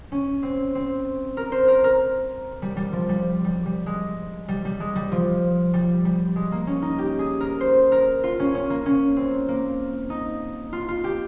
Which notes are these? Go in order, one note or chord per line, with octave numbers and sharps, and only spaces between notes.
C#4
C4
C4
A#4
C5
A#4
A#4
G3
G3
F3
G3
G3
G3
G#3
G3
G3
G#3
G3
F3
G3
G3
G#3
A#3
C#4
D#4
G4
G#4
A#4
C5
A#4
F4
C#4
C#4
A#3
C#4
C4
A#3
D#4
F4
F4
G4